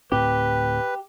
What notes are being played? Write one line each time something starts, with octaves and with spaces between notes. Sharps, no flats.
D2 A2 C4 G4 B4